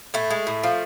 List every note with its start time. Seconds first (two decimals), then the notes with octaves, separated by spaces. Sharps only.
0.14 A2 A3
0.30 G#3
0.47 A2
0.63 F3